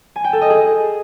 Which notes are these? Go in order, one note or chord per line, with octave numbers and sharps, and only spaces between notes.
G#5
G5
A4
D#5
G#4